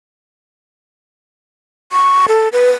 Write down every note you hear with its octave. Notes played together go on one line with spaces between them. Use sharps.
C#6
A4
B4